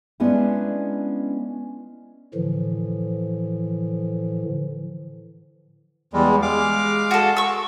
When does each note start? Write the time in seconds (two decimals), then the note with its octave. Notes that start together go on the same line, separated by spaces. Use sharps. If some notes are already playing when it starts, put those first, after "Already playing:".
0.20 G#3 B3 C#4 D4 E4
2.34 A2 D3 E3 F3
6.13 E2 G3 G#3
6.42 G#3 F5 D6
7.11 F#4 A4
7.37 C#6 E6